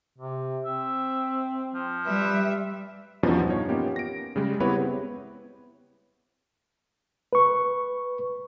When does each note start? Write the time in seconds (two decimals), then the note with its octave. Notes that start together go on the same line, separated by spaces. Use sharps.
0.18 C3
0.65 C4 E5
1.75 F3
2.06 G3 B4 E5
3.23 E2 G2 B2 F3 C#4 D#4
3.48 D#4 C#5
3.69 A#3 B3 C#4 F4 G4
3.96 A#6 D7
4.36 C#3 G3 G#3
4.60 B3 C4 E4 G4 B4 C#5
7.33 B4 C#6